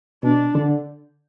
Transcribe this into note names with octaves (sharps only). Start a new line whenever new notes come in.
B2 D4
D3